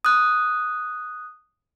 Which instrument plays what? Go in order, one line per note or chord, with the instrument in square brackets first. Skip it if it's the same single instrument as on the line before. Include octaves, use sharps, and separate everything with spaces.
[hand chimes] D#6 F#6